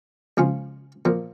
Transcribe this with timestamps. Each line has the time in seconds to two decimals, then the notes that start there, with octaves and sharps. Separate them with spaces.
0.37 C#2 C#3 F3 C#4 F4
1.05 A#2 F3 A#3